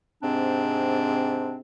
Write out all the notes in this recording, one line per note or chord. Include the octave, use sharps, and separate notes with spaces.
G#2 C3 C4 D4